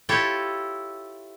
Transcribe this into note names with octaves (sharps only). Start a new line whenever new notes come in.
E4 F4 G4 A4 C#5